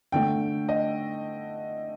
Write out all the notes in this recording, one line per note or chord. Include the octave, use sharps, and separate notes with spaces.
D3 A3 G5
D#5